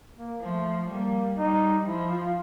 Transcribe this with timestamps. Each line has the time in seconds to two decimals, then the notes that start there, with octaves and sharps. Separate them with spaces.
0.17 A#3
0.41 F3 A3
0.90 G3 A#3
1.38 G3 D#4
1.86 F3 E4
2.10 F4